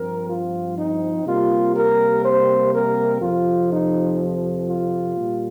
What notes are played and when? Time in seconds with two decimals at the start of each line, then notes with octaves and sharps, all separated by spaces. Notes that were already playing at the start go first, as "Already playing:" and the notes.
Already playing: G2 F3 C4 A#4
0.28 F4
0.76 D#4
1.25 C3 G3 A#3 F4
1.75 A#4
2.23 C5
2.73 A#4
3.21 F2 C3 F3 F4
3.71 D#4
4.68 F4
5.17 A#2 G3